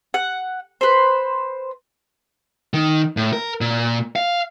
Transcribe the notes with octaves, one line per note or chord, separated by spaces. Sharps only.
F#5
B4 C5
D#3
A2
A#4
A#2
F5